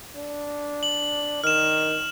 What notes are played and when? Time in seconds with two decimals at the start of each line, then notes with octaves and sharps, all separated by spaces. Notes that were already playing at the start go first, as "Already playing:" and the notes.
0.15 D4
0.83 F#7
1.44 D#3 F6 E7